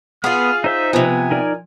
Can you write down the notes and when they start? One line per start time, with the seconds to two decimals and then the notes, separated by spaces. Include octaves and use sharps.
0.24 B3 F4 G#4 F#5 D#6 F6
0.64 D#4 C5 E5 G6
0.93 C3 F3 B3 G#5
1.31 D#4 A#4 D5